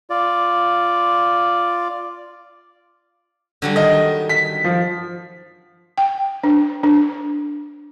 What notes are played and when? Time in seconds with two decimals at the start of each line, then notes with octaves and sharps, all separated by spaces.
0.10 F4 D5
3.62 D3 F#3 G3
3.76 D#3 D#5
4.29 B6
4.64 F3
5.98 G5
6.44 D4
6.83 D4